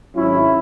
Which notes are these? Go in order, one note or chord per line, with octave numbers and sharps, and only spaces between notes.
G#1 G#2 F#3 C#4 E4